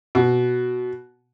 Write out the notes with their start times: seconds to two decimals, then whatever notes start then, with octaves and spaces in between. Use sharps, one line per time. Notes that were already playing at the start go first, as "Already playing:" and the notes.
0.15 B2